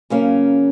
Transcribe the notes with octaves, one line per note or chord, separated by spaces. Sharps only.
C#3 F#3 A#3 C#4